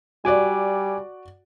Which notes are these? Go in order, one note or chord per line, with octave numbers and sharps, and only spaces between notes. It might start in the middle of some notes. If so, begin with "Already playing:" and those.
G3 F#4 D5 G#5 D6 F#6